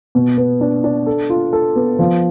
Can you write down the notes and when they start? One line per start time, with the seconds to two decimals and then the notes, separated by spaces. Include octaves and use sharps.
0.15 B2
0.37 B3
0.61 D4
0.84 D4
1.07 A4
1.30 F4
1.53 A4
1.76 B3
1.99 F3